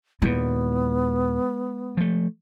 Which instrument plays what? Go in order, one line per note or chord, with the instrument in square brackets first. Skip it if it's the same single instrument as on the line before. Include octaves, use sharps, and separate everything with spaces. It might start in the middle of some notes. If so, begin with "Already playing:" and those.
[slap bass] D#2 A#2 [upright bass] G#3 E4 [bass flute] B3
[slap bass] F3 A3